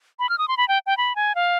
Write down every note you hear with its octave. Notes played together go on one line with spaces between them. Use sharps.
B5
F6
D#6
C6
B5
G5
G5
B5
G#5
F5